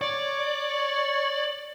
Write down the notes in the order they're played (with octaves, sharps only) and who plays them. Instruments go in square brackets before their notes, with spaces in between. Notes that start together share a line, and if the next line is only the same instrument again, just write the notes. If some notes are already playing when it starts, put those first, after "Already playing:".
[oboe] C#5 [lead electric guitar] D5